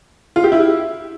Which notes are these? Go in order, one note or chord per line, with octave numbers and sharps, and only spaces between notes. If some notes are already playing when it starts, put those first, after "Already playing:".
F4
G4
E4